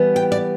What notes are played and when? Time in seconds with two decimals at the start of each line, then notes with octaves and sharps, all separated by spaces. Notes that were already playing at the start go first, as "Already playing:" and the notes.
Already playing: E3 G3 B3 E4
0.16 G5
0.32 D5